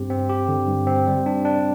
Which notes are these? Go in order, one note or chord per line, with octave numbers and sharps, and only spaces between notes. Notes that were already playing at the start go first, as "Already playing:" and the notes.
Already playing: G2 C4 G4
C4
G4
D3
G2
C4
G3
D4
D4